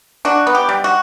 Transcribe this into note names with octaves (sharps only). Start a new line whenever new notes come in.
D4 F#4
B3
G4
G3
F#4